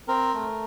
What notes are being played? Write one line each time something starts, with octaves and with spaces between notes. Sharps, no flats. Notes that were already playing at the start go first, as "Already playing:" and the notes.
C4 A#4
A3